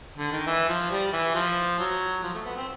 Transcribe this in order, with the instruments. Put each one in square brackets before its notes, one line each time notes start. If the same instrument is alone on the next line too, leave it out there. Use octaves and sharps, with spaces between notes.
[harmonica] D3
D#3
E3
F3
G3
E3
F3
F#3
F3
A3
B3
C4